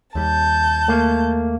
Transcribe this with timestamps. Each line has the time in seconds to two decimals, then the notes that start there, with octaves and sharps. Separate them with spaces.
0.15 D#2 G3 A5 G6
0.88 A3 A#3